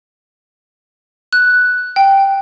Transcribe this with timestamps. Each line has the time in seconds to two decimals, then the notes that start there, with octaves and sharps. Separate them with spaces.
1.33 F#6
1.96 G5